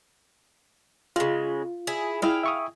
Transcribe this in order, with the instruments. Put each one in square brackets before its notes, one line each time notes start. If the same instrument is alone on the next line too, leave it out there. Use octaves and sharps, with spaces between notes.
[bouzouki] C#3 G#3 [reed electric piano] F4
[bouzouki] E4 G#4
[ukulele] E4 G#4 G5 [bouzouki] F5
[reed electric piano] E5 C#6 D#6